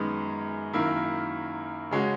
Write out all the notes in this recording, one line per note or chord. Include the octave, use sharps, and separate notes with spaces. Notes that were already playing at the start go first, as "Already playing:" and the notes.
Already playing: F#2 D#3 G#3 B3
F#2 D#3 A#3 E4
C#3 G#3 C#4 F#4